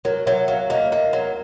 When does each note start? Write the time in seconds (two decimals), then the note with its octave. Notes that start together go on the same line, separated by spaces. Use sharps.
0.05 F#3 A#4
0.26 F#3 E5
0.48 F#3 F5
0.70 A#3 D#5
0.92 A#3 D#5
1.13 F#3